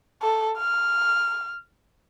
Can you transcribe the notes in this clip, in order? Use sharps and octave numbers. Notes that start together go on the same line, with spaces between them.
A4
F6